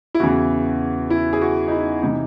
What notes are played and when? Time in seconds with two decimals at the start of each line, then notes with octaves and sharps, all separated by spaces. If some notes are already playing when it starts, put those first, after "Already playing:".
0.14 E4
0.20 E2 C#3 E3 F#4
1.10 E4
1.33 G#4
1.41 F#4
1.67 D#4
1.71 E4
2.02 C3 E3 D#4